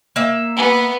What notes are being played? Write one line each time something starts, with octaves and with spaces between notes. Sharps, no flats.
A#3 E5
B3